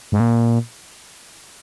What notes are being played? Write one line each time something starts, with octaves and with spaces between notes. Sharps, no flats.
G#2
A#2